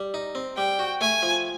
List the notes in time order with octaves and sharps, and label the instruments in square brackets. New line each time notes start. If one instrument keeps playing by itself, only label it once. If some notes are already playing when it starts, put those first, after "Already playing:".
Already playing: [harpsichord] G3
D#4
C4
[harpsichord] G3 [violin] G5
[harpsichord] F#4
[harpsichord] A3 [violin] G#5
[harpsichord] F3